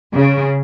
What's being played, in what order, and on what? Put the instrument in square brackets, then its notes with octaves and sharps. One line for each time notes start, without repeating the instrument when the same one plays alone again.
[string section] C#3